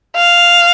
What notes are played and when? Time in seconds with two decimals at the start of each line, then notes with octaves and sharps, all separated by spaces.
0.16 F5